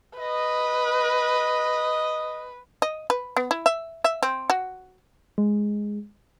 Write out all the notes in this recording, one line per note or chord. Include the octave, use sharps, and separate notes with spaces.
B4 D#5
D#5
B4
B3
E4
E5
E5
C4
F#4
G#3